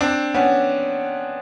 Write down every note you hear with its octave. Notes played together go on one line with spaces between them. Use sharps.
C4 D4
B3 C#4